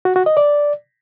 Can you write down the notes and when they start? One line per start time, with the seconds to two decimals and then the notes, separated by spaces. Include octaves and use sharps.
0.05 F#4
0.16 F#4
0.26 D#5
0.37 D5